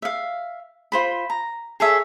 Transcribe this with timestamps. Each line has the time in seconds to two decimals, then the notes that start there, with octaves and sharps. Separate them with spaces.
0.02 E5 F5
0.92 F4 C5 B5
1.30 A#5
1.80 G#4 A4 C#5 E5